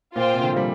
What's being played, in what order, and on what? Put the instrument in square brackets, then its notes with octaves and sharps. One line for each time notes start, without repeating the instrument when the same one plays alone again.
[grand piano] A#2 A#3 [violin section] F4 C5 G5
[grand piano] C3
D3
F3
G3